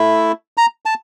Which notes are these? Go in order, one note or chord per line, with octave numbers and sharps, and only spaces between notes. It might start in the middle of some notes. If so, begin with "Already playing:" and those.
Already playing: A3 E4
A#5
A5